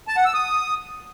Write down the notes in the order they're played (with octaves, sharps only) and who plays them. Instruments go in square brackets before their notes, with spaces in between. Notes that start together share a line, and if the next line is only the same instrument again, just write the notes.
[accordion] A5
F#5
E6
D#6